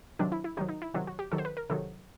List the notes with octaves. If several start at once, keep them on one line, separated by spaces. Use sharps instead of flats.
C3 D#3 F#3 D4
E4
E4
C3 D#3 F#3 D#4
D#4
E4
C3 D#3 F#3 F4
F#4
G4
C3 D#3 F#3 A4
C5
B4
A#4
C3 D#3 F#3 A4